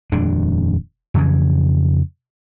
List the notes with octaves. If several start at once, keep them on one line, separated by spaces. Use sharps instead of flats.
D#1 F2 G#3 D4
F2 C#3 E3